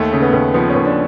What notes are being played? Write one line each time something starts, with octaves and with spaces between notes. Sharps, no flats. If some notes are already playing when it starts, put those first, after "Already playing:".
Already playing: D#2 A3
C#3
B3
D#2
F3 B3
C#4
D#2
D4